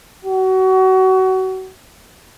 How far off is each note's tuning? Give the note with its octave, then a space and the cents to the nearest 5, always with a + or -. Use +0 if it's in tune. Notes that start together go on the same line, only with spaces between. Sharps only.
F#4 +30